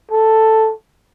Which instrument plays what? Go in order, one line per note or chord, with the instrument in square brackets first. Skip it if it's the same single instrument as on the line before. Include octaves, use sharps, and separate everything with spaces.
[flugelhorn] A4